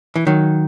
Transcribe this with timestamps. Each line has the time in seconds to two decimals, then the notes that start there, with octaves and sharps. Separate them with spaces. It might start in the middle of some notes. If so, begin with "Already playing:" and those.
0.16 E3
0.27 D#3 F#3